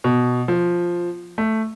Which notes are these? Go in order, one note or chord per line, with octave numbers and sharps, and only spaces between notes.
B2
F3
A3